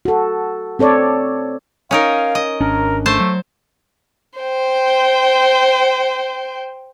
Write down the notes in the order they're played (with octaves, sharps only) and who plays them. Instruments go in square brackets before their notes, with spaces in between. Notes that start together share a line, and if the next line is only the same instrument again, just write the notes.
[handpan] F#4 A4
C4 A4 C#5 D5
[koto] C#4 D#4 A#4 [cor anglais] F5
[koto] D#5
[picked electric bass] G#1 C#4 D4 [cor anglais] A#4
[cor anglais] A3 [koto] C5 A5
[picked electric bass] F#3
[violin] C5 G5